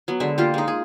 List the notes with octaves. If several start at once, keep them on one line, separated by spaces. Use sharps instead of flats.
F#3 B3
D3 G#3 E5
A#3 F4 G4
G#3 D#4
G#4